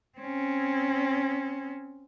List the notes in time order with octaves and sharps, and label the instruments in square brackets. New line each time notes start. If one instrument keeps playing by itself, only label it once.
[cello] C4 C#4